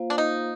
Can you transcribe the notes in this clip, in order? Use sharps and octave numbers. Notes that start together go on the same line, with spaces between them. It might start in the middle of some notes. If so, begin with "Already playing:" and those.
Already playing: A#3 F4 C5 F5
D4
D#4